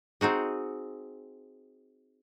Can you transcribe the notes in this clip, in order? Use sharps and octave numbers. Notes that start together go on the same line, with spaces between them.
C4 D#4 F#4 G#4